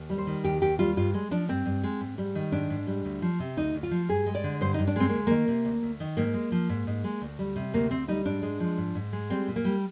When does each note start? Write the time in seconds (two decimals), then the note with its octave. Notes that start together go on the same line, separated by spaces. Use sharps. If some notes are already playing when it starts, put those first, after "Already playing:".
Already playing: D#2
0.10 G3
0.18 C5
0.27 D#3
0.44 D#2 G4
0.62 D#2 G4
0.79 G3 F4
0.97 G2 F4
1.14 G#3
1.31 F3 D4
1.48 G2 C4
1.66 G2
1.84 G#3
2.01 G#2
2.18 G3
2.35 D#3
2.52 G#2 D4
2.70 G#2
2.87 G3
3.05 D2
3.22 F3
3.40 C3
3.57 D2 D#4
3.75 D2
3.83 F4
3.91 F3
4.09 G2 G#4
4.26 G#3
4.35 D5
4.44 D3
4.61 G2 C5
4.74 D#4
4.79 G2
4.87 D4
4.96 G#3 C4
5.09 A#3
5.14 D2
5.27 D#3 A#3
5.48 C3
5.65 D2
5.83 D2
6.00 D#3
6.17 G#2 A#3
6.34 G#3
6.52 F3
6.69 G#2
6.87 G#2
7.04 G#3
7.22 D2
7.39 G3
7.56 C3
7.74 D2 A#3
7.91 D2 C4
8.08 G3 D#4
8.25 G#2 D4
8.43 G#3
8.60 F3
8.78 G#2
8.95 G#2
9.13 G#3
9.30 G3 C4
9.48 A#2
9.56 A#3
9.65 G3